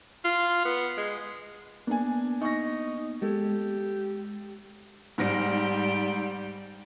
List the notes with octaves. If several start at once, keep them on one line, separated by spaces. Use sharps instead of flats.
F4
B3
G#3
A#3 B3 D4 G#5
D#4 C#6 A#6
G#3 G4 A4
G#2 G3 F6 A#6